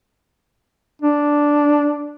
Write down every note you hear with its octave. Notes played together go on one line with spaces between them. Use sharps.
D4